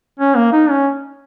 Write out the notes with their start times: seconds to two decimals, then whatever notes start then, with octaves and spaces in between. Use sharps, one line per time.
0.20 C#4
0.36 A#3
0.53 D#4
0.69 C#4